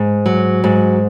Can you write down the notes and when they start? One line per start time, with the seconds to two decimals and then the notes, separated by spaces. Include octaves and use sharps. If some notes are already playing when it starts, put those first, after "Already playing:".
Already playing: G#2
0.26 F#3
0.64 G#2